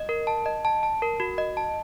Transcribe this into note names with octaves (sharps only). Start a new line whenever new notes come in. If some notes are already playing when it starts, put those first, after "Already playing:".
Already playing: D#5
A#4
A5
D#5
A5
A5
A#4
F#4
D#5
A5